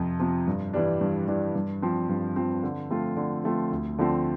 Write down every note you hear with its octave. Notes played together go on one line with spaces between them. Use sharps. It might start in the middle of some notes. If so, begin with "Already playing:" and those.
Already playing: F2 C3 F3
C3 F3
G2
E3 G3 D4
G2
E3 G3 D4
G2
F3 C4
G2
F3 C4
D3
F3 A3 C4 F4
D3
F3 A3 C4 F4
D2
D3 F3 A3 C4